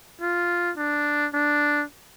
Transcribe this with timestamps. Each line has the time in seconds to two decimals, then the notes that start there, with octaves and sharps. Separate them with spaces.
0.21 F4
0.77 D4
1.34 D4